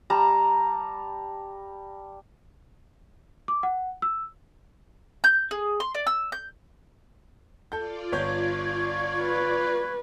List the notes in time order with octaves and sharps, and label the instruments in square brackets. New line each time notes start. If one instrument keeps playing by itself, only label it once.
[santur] G3 A5 A#5
[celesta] D6
F#5
E6
[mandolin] G6
G#4
C6
D5
E6
G6
[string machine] F4 D5 [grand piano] A4 G6
[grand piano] G1 C#5 G6 [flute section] C#6 G#6
[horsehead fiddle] B4